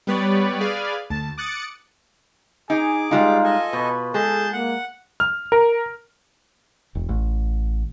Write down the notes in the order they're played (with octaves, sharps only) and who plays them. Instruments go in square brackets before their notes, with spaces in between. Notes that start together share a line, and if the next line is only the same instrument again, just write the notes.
[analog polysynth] G3 B3 B4 C#5 D5
G#4 B4 D5 F5 G#5
D2 A5
D6 D#6 F#6 A6 C#7
[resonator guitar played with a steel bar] D#4 [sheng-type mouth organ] G#4 D6 [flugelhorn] G#5
[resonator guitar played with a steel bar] G3 G#3 D#4 [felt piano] F4 [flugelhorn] F5
[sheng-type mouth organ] A4 D#5 G#5
[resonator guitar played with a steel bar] B2 [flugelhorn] B4
[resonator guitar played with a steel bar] G#3 [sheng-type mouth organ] G#4 A5 G6 [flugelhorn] A4
[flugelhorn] A#3 [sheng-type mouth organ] F#5
[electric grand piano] F6
A#4
[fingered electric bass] E1
A1